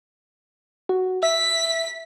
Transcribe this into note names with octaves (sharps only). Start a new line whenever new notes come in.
F#4
E5 B6